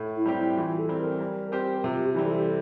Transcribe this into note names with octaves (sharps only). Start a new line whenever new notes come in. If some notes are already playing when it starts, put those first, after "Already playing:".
Already playing: A2
E4
G3 C4 G4
E4
E3 F4
A4
G3 C4
A#4
G3
C4 G4 C5
C3 F4
G4
E3 G3 C4
A4